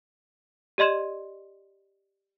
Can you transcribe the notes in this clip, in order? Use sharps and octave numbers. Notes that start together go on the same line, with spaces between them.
G4 D5 D#5 C6 G#6 E7